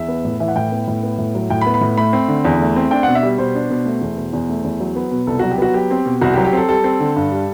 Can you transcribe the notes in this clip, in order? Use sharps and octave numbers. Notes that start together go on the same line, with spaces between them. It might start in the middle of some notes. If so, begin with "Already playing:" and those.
Already playing: E2 E5
B3
A2
E3 E5
F#5
A2 G5
B3
A2
B3
A2
F#3
A2 G5
B5
B3
B5
A2
A3 B5
C4
D3
E2
A3
C4
D4 G5
B2 F#5
E5
G3
B2 C5
D4
B2
A3
E2
B2
E2
A3
E2
F#3
B3
B2
C2 A4
F#3 F#4
G4
B3 F#4
F#3 G4
C4
B2
C2 F#4
G4
F#3
G4
C4 A4
G3 A4
C4
D3
G2
G3